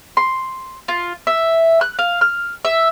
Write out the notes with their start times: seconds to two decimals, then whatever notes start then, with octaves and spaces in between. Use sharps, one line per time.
0.17 C6
0.88 F4
1.27 E5
1.81 F#6
1.99 F5
2.21 F6
2.65 E5